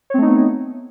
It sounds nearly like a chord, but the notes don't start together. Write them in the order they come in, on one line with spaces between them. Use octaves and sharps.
C#5 C4 A3 D#4 B3